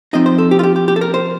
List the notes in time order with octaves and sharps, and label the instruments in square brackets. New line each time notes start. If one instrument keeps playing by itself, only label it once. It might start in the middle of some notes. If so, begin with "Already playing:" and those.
[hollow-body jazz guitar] F3 C4 D#4 D#5
C5
A4
G4
F4
G4
G4
G4
A4
A#4
C5